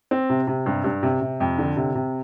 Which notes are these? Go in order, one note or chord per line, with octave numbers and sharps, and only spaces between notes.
C4
C3
C3
G2
G2
C3
C3
F2
D3
C3
C3